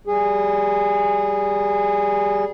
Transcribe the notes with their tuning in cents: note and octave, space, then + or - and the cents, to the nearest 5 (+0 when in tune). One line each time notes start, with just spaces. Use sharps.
G3 -10 G#4 -15